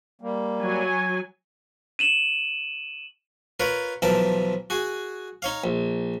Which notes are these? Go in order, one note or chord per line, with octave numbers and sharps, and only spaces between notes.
G3 A#3
F#3 G#5
D#7 E7 F#7
F4 A#4 B4 C#5
B1 E3 F3 A#4 A5
F#4 G#4
D#4 C#5 F5
A#1